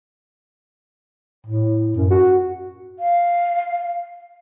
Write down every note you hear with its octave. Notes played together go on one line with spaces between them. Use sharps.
A2
F#2
F#4
F5